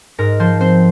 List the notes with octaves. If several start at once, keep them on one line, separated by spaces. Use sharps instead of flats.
G#2 A#4
F3 C5
C4 C5